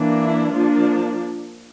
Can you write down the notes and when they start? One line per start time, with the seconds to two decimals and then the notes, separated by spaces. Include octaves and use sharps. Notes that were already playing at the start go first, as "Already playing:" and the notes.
Already playing: E3 A#3 D4
0.22 E4
0.54 F3 A#3 D4 F4